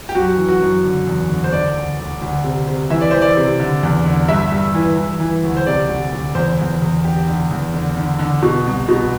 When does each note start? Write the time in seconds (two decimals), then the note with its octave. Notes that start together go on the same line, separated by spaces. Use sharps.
0.09 G4
0.15 F#2 F#4
0.37 E3
0.49 F#4
0.61 F#2
0.83 D3
1.07 E2
1.30 D3
1.44 C5
1.52 D3 D5
1.76 D2
1.99 D2
2.22 D2
2.44 C3
2.67 C3
2.90 E3 E5
3.01 D5
3.11 E3 C5
3.22 D5
3.37 C3
3.60 D3
3.83 E2
4.06 D3
4.28 G2 E5
4.52 G2
4.75 E3
4.97 E3
5.20 E3
5.43 D2
5.57 C5
5.66 C3 D5
5.89 D2
6.13 D2
6.35 E2 C5
6.59 E2
6.82 E2
7.05 D3 G4
7.28 D3
7.51 E2
7.74 D3
7.97 D3
8.19 D3
8.42 B2
8.66 C2
8.89 B2